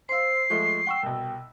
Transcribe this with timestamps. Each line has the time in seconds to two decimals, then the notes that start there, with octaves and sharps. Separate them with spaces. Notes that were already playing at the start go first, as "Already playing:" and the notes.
0.09 C5 F5 C6 E6 C7
0.50 F3 G#3 A3 C#6
0.87 F#5 G5 C#6 E6
1.03 C2 B2